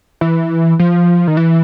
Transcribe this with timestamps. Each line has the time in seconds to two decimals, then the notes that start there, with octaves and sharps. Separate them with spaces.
0.21 E3
0.79 F3
1.27 D#3
1.37 E3